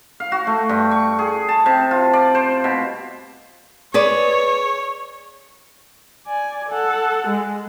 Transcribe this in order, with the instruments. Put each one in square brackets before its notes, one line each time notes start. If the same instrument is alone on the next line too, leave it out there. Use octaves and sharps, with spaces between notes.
[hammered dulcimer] F5
F#4
A3
G2
C#6
G#4
A5
C3
F4
D5
C5
B2
[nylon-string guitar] G#4 B4 D5 [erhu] C#5
[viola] D5 G#5
A4 F#5
G#3